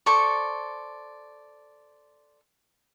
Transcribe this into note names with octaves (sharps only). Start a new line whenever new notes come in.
A4 C5 D5 C#6